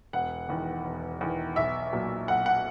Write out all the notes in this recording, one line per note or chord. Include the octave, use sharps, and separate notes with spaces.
E1 F#5
E2 D#3
E1
E2 D#3
B1 E5
A#2 F#3
B1 F#5
F#5